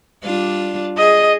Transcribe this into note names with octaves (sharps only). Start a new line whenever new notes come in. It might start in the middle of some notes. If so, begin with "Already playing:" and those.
G3 D4 F4
G#4 D#5